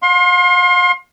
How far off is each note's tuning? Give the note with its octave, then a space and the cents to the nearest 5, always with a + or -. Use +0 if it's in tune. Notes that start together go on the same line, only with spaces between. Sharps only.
F5 +40 C6 +30